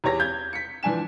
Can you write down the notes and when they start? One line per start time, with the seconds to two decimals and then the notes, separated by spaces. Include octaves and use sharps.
0.04 E2 G4 C#5 A#6
0.20 G6 G#6
0.53 B6 C#7
0.83 E3 F3 D4 G#5 E7